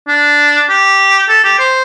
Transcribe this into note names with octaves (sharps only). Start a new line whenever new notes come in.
D4
G4
A4
G4
C5